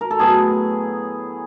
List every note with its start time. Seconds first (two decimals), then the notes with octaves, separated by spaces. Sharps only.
0.01 A#4
0.11 A4
0.19 A2 F#3 B3 G#4